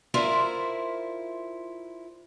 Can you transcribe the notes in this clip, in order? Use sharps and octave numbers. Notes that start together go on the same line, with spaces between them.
E4 F4 A#4 C5 D5 E5